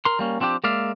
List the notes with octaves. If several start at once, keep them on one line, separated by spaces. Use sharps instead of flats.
A#4 C6
G3 A#3 C#4
F3 C4 D4 F4 G4
G#3 A#3 D5 E5 F5